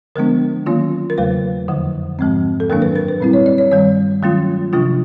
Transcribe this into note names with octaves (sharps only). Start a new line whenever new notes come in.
D3 F3 G#3 B3 D4 A#4
D#3 F#3 A#3 C#4 F4
A#4
E2 C#3 F#3 A3 B4
F2 D3 F3
G#2 F3 G#3 C4
A4
F#2 D#3 F#3 A#3 D4 A#4
B4
A#4
B4
A#2 G3 C4 E4
C#5
D5
C#5
G2 D#3 G3 C#5
D#3 F#3 A3 C#4 F4
C3 F3 A3 D4 F4